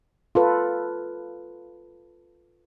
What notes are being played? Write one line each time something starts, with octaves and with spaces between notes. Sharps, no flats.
F4 A4 B4